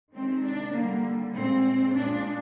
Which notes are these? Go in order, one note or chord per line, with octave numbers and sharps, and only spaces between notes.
C3 D#3 G#3 C4
D4
D3 G3 A#3
A#2 G#3 C4
A#2 G#3 D4